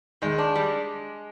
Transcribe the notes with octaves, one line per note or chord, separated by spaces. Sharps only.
D#3 G#3
D4
G3